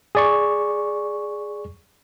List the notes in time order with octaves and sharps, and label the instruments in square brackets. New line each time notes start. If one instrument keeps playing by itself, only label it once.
[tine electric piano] G#4 D5 C#6